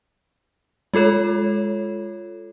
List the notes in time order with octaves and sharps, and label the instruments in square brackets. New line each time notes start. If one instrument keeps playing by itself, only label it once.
[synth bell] G#3 F4 A4 C#5